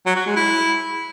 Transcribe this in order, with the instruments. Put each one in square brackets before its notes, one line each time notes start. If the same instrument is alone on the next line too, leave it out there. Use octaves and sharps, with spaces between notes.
[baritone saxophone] F#3
F#4
G#3
E4